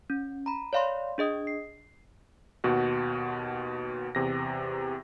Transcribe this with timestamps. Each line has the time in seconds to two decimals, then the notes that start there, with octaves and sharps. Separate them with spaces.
0.10 C#4
0.46 A#5 B5
0.73 C#5 D5 F5 B5 C6
1.18 D4 G#4 D#5 D#6
1.47 C7
2.64 D#2 B2 F#4
4.15 E2 C3 A#6